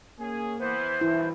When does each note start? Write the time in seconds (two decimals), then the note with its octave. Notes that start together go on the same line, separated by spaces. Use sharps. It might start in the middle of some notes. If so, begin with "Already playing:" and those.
0.19 A#3 C#4 G#4
0.60 E3 B3 C5
1.01 B1 G2 E3 E4